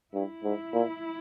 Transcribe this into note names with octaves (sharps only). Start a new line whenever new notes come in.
G2 E4
G#2
A#2